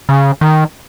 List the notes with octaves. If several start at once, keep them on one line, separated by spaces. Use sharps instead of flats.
C#3
D#3